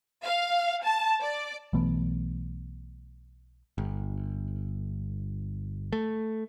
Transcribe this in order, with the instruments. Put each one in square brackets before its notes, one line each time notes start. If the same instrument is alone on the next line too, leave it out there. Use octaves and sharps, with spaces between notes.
[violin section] F5
A5
D5
[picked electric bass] B1 E3 A3 B3
G1
A3